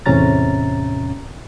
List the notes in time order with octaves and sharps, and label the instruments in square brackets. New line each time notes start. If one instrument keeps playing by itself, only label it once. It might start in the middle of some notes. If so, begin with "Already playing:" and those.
[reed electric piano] E2 A2 C3 C#4 A#5 A6